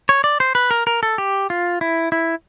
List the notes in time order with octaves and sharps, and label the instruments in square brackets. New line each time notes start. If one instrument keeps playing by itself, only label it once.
[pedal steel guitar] C#5
D5
C5
B4
A#4
A#4
A4
G4
F4
E4
E4